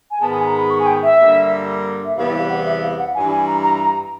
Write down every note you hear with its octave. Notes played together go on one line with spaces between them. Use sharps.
G#5
G#2 D#3 G#3 B3 A5
G#5
A#5
B5
C#6
G#5
G5
E5
G2 D3 G3 A#3
E5
E2 C3 E3 G3 B3 F5
F5
F#5
E5
F5
F#5
G2 E3 G3 G#5
G#5
A#5
A#5
A#5